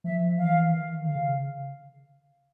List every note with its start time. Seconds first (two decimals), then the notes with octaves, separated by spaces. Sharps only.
0.04 F3 E5
0.38 E3 F5
0.71 D#3
1.04 D3 F5
1.15 C#3